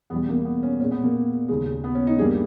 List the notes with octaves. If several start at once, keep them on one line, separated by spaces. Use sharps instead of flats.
E2 B2 G3 B3
A#3
B3
C#4
A#2 G#3 C#4
B3
A#3
D#2 C#3 G#3
B3
C#4
D#4
G2 G3 A#3 G#4